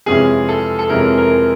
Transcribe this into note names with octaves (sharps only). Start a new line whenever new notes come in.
F2 C3 E3 G#3 C#4 G#4
A4
A4
F2 C3 E3 G#3 C#4 A#4
A#4